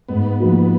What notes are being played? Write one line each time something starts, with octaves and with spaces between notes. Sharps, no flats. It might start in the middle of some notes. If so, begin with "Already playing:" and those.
G#2 B3
F3 A#3 D#4 F#4